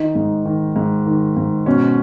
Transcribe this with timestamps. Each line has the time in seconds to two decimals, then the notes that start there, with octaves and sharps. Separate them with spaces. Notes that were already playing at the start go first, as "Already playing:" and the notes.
Already playing: D#3 D#4
0.15 G#2
0.45 D#3
0.76 G#2
1.06 D#3
1.37 G#2
1.66 B2 C#4